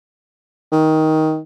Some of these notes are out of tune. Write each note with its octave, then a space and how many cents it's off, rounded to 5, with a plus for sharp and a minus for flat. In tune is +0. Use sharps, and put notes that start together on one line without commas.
D#3 +15